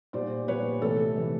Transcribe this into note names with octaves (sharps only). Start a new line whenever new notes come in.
A#2 G3 B3 C5 D5
A#2 G3 B3 B4 C#5
C3 E3 A3 A4 B4
C3 E3 A3